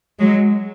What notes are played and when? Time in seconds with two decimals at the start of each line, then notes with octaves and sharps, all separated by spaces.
0.19 F#3 G#3